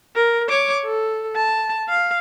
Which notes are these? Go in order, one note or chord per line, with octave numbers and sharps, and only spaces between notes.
A#4
C#5 D6
A4
A5
F5